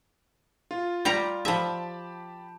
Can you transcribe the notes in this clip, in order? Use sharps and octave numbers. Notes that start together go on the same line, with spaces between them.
F4
G3 G4 A#5
F3 G4 E5 A5 B5